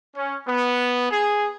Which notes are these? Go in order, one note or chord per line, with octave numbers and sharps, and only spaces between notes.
C#4
B3
G#4